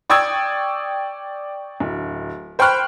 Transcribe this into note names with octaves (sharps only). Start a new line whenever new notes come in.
D5 G5 C#6 D#6 E6 G#6
D1
C5 G5 B5 C#6 F6 F#6